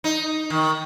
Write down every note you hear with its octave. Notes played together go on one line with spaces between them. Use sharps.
D#4
D#3